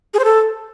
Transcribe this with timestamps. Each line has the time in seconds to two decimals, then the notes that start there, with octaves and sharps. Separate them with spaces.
0.14 G#4
0.19 C5
0.24 A4